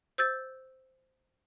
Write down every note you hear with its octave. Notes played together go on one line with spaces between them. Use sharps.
C5 E6 G6 A6